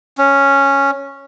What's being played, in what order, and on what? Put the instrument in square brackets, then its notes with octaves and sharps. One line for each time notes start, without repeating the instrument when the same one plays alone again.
[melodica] C#4